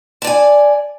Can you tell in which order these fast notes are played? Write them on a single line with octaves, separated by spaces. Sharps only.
A5 D5 G#5